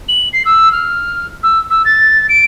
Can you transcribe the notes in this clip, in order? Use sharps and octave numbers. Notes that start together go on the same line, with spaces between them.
F#7
C7
E6
F6
E6
E6
A6
D7